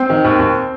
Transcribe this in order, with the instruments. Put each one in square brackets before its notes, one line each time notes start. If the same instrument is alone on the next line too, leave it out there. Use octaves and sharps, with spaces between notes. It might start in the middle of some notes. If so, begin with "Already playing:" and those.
Already playing: [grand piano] C4
[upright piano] D#3
D#2
D#2